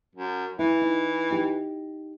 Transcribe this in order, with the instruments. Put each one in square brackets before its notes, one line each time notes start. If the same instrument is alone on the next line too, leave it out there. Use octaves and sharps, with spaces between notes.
[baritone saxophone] F#2
[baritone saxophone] E3 [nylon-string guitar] E4
[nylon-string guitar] D#4
D#4 G4